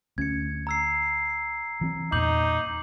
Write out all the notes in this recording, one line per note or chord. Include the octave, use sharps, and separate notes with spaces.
D2 C#4 G#6 C#7
A#5 E6 C7
E3 C4
E2 A#2 D#4 D6 G6 F#7